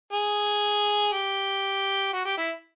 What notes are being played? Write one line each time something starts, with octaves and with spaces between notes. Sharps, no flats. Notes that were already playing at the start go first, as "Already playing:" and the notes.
G#4
G4
F#4
G4
E4